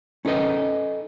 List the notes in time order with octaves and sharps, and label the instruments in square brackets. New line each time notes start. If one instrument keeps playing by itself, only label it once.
[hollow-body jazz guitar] C#4 D#4 A4 B4 D#5